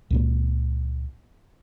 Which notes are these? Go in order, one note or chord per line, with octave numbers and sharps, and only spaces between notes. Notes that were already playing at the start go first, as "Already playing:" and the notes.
C#2 A#2 A#3